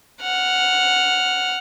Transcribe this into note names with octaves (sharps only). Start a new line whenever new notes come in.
F#5 F6